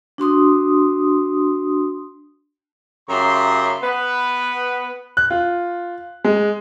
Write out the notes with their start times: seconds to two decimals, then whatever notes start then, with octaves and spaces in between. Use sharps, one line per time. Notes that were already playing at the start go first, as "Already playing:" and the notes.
0.18 D4 F#4 C6 D#6
3.09 F#2 C#3 G4 E5 A#5 C6
3.82 B3 B4
5.17 F#6
5.31 F4
6.24 G#3